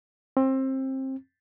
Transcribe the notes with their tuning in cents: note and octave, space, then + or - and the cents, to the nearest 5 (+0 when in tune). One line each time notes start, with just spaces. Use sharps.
C4 +25